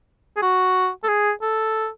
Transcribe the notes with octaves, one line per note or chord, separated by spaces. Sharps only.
G#4
F#4
A4
G#4
A4